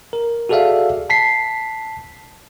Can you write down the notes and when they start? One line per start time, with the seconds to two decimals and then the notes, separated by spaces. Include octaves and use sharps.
0.13 A#4
0.49 F#4 G#4 A4 D5 E5 F5
1.10 A5 B6 C7